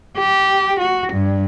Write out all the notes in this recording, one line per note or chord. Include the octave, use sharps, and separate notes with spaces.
G4
F#4
G2